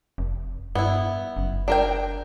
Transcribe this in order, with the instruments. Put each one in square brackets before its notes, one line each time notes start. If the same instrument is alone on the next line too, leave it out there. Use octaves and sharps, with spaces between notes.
[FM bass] F1
[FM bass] G2 [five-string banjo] B3 E4
[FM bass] F#1
[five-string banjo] D4 A#4 G5